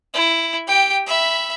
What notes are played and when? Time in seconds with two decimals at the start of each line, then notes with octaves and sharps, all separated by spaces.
0.14 E4
0.68 G4 G5
1.07 E5 B5